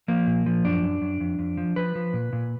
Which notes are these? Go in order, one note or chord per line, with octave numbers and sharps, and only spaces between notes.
F3 A#3
A#2
F3
F#2 D4
F#2
F#2
F2
F2
F3
F3 B4
F3
A#2
A#2